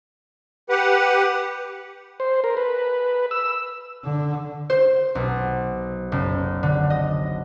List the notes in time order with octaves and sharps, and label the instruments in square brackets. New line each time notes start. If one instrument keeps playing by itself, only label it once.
[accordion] G4 B4 F#5
[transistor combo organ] C5
A#4
B4
E6
[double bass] D3
[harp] C5
B1
F#1
D3
D#5